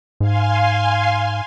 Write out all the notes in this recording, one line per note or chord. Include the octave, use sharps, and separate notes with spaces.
G#2 F5 G#5 C6